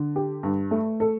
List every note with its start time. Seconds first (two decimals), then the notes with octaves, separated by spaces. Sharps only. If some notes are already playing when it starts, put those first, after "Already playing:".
Already playing: D3
0.16 G4
0.43 G2
0.71 A3
1.00 A4